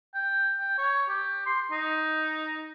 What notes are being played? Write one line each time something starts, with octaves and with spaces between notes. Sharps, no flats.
G5
G5
C#5
G4
C6
D#4